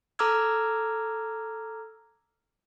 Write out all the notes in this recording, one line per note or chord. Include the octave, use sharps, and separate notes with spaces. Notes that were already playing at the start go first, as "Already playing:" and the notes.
A4 A#5 D6 E6 F6 G#6